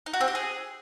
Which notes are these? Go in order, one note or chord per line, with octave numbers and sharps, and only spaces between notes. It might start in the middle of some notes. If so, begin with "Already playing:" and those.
D#4
F#4
C4
G4
G#4